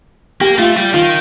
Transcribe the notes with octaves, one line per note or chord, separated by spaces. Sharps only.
A#3 G4
A3 F4
G3
D#3 F4